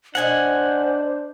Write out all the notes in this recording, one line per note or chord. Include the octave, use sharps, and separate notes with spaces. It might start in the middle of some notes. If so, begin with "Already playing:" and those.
B2 D4 A#4 C5 D#5 F#5 G#5